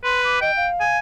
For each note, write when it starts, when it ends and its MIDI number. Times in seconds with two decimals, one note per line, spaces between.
0.04 0.36 71
0.04 0.22 84
0.24 0.41 86
0.41 0.51 75
0.41 0.67 79
0.56 0.98 77
0.80 0.99 80